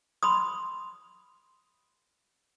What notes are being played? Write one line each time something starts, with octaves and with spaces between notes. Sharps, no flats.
B5 C6 D#6